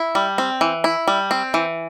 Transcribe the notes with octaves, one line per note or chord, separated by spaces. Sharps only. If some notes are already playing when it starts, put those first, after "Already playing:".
Already playing: E4
G3
C4
E3
E4
G3
C4
E3